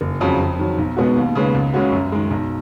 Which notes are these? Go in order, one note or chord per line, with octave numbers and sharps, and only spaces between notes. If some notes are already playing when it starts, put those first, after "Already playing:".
F#1
F2 C#3 F#3
F2
D#3 F#3
B1
B2 G#3 B3 F#4
D#2
C#3 G#3 B3
C#2
C#3 G#3 C#4 F#4
F#2
D#3 G#3
B1